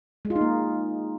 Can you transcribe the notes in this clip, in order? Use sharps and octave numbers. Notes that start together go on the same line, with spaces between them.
G#3
F4
D#4
A#3